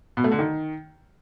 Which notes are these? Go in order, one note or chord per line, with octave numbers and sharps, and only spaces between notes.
B2
A3
D3
D#3